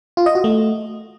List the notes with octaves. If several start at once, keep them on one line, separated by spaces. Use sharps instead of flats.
F4
D#5
F#4
A3